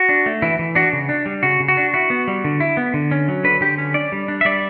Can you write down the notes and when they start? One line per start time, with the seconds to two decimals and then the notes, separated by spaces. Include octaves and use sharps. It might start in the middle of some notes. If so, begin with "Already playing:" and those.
Already playing: F#4
0.09 D4
0.26 A3
0.42 E3 E4
0.59 E3
0.75 D4 F#4
0.93 C#3
1.09 D4
1.26 G3
1.43 C#3 F#4
1.60 C#3
1.68 F#4
1.77 D4
1.94 E4 F#4
2.10 B3
2.28 G3
2.44 D3
2.60 E4
2.77 B3
2.94 D3
3.11 C#4
3.28 F#3
3.44 D3 B4
3.61 D3 G4
3.78 C#4
3.94 D4 D5
4.12 G3
4.28 D4
4.41 E5
4.45 G3 D5